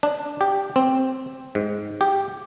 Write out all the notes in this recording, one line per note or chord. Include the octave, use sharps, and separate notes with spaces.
D4
G4
C4
G#2
G4